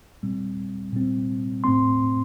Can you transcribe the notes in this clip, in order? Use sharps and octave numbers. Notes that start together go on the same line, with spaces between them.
A#2 G3 C4
A#2 G3 C4
A2 A3 C4 C6